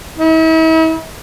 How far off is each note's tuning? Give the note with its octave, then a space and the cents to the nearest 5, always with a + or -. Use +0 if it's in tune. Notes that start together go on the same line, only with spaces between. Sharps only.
E4 -45